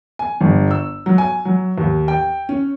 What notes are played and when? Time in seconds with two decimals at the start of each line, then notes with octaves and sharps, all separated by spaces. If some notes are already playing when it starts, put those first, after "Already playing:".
0.19 G#5
0.41 G1
0.71 E6
1.06 F#3
1.18 G#5
1.45 F#3
1.78 D#2
2.08 G5
2.49 C#4